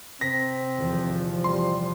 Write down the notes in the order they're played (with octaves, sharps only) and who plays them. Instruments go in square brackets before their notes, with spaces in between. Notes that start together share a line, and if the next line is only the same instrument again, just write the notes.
[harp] C3 [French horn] C4 [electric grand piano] A#6 B6
[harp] D#1 E2 [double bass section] F3
[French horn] G3 [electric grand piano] C6